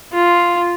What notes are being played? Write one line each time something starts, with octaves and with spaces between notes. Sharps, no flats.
F4